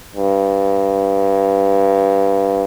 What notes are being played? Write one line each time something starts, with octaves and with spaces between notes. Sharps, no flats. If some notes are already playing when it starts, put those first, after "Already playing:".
G2